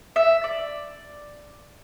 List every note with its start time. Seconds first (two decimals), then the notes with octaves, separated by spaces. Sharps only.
0.16 E5
0.44 D5